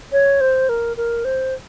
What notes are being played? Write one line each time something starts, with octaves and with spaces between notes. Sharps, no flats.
C#5
C5
A#4
A#4
C5